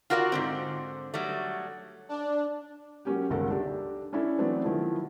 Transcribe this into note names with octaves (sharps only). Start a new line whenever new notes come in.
F4 F#4 A#4 D5 D#5 F#5
G#2 D3 C4
F#3 G3 A3
D4
F#3 A#3 C#4 G4
G1 C#2 D#3 A4 A#4 F#5
D4 G4
C#4 D4 E4 A4
E3 F#3 A3 B3 C4 D4
D#3 F3 F#3 A3 E4